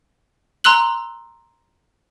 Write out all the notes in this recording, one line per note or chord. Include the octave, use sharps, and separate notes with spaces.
A#5 C6 E6 F#6 F#7